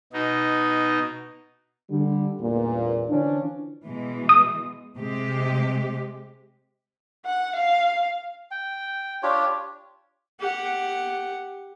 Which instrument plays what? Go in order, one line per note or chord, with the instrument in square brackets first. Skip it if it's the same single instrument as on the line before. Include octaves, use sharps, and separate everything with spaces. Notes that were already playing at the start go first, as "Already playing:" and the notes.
[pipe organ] B2 D#4
[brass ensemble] D3 G3
A1 E2 G2 A#2
D3 E3 F3 C#4 D4
[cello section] B2 E3 G#3
[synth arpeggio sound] D#6
[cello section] C3 G#3 G4
[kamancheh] F#5
F5
[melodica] G5
D4 F4 G4 C#5
[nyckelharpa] G4 F#5